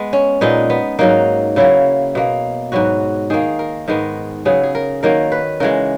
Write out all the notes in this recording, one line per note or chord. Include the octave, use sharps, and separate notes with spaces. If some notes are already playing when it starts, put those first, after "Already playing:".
Already playing: G#3 B3
C#4
A#2 G#3 B3 D#4
B3
G#2 F#3 A#3 D#4
C#3 F#3 A#3 E4
B2 A#3
G#2 F#3 B3 F#4
D#3 A#3 G#4
A#4
G#2 D#3 G#3 B3 A#4
C#3 F#3 B3 G#4
G#4
A#4
D#3 F#3 A#3 A#4
B4
C#3 E3 G#3 A#4